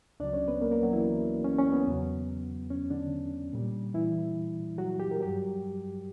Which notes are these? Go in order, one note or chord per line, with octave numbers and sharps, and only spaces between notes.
C#2 C#3 F#3 D4 D5
C#4 C#5
B3 B4
A#3 A#4
A#3 A#4
F#3 F#4
E3 E4
C#4
C#4
B3
E2 C#3 F#3
C#4
D3 D4
A#2 G3
E3 E4
F#3 F#4
G4
A#4
G2 F#3 G3 G4